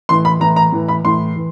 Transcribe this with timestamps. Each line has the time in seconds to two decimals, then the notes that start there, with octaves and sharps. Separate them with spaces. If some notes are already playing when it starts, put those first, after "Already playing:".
0.09 A2 E3 C6
0.25 B5
0.40 A2 E3 A#5
0.56 A#5
0.72 A2 E3
0.88 B5
1.05 A2 E3 C6
1.36 E3